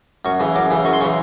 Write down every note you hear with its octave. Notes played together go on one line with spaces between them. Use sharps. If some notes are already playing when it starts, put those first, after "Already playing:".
F#2 C#6
C#3 E3
F#2 D6
C#3 E3
F#2 C#6
C6
C#3 E3 C#6